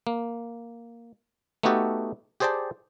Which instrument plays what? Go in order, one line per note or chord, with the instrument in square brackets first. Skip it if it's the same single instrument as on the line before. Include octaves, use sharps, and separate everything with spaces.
[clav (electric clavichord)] A#3
A3 B3 D#4 F#4 G4 A4
G4 G#4 C5 D5 G5 A5